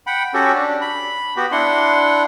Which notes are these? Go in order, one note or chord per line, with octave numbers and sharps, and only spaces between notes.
F#5 G5 B5
C#4 F#4 G4 A4
D4
B5
B3 F#4 G4
D4 E4 F#5 C6